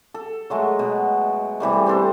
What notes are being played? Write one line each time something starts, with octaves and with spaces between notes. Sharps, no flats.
A4
F#3 G#3 A3
B2
C3 E3 G3 A3
C4 D4 A4 C5